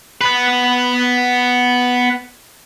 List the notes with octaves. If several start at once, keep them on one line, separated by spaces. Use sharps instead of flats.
B3 B4